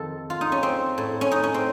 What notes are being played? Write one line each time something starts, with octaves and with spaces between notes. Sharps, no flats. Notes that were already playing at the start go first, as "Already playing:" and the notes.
Already playing: F2 D#3 A4
F4
D#4
C#4
C4
A2
C#4
D#4
C#4
C4